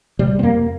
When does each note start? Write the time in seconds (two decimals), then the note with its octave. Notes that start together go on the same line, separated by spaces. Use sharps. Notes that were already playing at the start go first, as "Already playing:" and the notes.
0.19 C3 G3
0.39 C4
0.43 F2 A#3